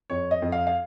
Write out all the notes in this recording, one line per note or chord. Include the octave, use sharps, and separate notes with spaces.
F2 C#5
D#5
F2
F5
F5